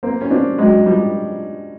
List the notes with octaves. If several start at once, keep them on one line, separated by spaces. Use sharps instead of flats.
A#3 C4
C#4
C4 D4
F#3 G#3
F3 G3